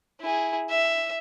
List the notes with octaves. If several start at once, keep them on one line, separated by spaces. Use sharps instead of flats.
E4 G#4
E5